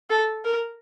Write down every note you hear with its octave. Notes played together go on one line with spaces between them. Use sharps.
A4
A#4